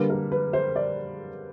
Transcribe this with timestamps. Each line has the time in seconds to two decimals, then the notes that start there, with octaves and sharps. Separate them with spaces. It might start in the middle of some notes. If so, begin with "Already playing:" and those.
Already playing: D3 G3 A#3 B4
0.10 A#4
0.32 B4
0.53 C5
0.76 D5